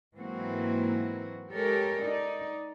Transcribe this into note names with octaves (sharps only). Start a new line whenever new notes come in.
G#2 E3 F#3 A#3 C4 F#4
G#3 G4 A4 A#4 C#5
D#4 D5